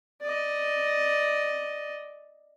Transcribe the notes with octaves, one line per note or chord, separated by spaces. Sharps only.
D5 D#5